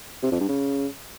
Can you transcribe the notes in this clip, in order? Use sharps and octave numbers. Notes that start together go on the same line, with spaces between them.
C3
F2
G2
C#3